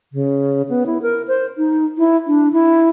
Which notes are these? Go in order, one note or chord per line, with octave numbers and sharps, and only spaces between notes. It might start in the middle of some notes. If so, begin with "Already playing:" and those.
C#3
B3
E4
A#4
C5
D#4
E4
D4
E4